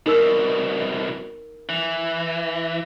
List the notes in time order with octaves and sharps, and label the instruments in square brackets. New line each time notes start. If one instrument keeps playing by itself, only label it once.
[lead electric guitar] C2 B2 [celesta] D#4 A#4 E6
[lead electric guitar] E3